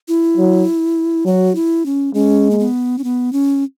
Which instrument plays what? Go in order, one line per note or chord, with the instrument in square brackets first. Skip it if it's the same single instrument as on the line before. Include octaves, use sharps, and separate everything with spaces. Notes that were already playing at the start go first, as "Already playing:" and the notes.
[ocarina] E4
[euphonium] F#3
[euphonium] F#3 [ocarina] F#4
[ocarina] E4
C#4
[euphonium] G#3 [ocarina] C#4
[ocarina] A#3
B3
C#4
B3
C#4